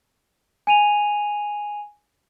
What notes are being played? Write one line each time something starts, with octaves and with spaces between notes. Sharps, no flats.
G#5 D#7 F7